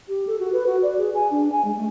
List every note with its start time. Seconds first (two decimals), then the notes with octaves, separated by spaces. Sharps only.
0.08 G4
0.27 A4
0.39 F#4
0.53 B4
0.67 F#4
0.83 D5
0.98 G#4
1.15 G#5
1.31 D4
1.52 G#5
1.65 G#3
1.77 A3